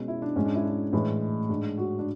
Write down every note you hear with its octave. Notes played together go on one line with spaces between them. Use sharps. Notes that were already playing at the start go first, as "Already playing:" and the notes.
Already playing: B2 G#3 C#4
E4
D4
G#2 G#3 C#4
D4
E4
D4
A2 E3 G#3
G#2 G#3 D4
F#4
D4